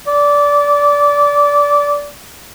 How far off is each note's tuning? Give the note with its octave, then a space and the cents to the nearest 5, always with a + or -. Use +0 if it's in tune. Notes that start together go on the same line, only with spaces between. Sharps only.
D5 -20